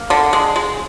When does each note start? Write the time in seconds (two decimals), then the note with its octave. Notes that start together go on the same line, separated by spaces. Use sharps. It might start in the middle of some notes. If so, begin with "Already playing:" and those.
Already playing: A#3
0.10 D3
0.33 G#3
0.56 G#3